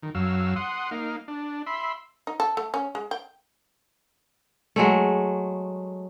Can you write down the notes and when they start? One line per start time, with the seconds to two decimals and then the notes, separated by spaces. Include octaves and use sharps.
0.03 D#3
0.15 F#2 F#3 F5 E6
0.56 F#5 C6 D#6
0.91 A#3 D#4 F5
1.28 D4
1.66 E5 B5 C6
2.27 D#4
2.40 A4
2.57 A3
2.74 C#4
2.95 G#3
3.11 G5
4.76 F#3 G#3 A3